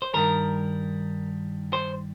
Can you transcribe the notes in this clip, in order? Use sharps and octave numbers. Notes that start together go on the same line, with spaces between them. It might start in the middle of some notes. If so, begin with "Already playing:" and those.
C5
G2 D#3 G3 A#4
C5